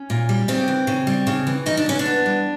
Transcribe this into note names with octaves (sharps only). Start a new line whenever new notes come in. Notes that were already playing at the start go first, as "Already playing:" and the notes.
Already playing: C#4
A#2
G3
C#3 C4
E3
C#3
G3
C#3
E3
C#3 D#4
D4
E3 C#4
D4
B3
G3